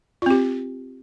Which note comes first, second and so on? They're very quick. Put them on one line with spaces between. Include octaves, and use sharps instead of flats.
F4 C4 G4